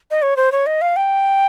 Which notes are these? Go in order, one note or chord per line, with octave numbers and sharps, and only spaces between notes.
D#5
C#5
C5
C#5
D#5
F5
G5